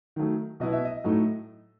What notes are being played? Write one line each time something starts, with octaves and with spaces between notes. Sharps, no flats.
D#3 F#3 A3
B2 F#3 B3 E4 D#5
E5
D#5
A2 F#3 A3 D#4